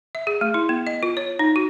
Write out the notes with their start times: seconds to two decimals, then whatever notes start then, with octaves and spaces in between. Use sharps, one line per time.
0.15 E5
0.27 G#4
0.41 A3
0.54 E4
0.69 B3
0.87 D#5
1.03 F4
1.17 C#5
1.39 D#4
1.56 F#4